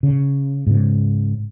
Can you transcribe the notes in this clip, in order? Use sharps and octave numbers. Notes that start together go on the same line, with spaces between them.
C#3
G#2 C#3